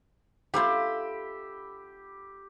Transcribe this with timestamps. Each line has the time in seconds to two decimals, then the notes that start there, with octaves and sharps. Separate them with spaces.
0.54 A3 D4 F4 G4 B5 E6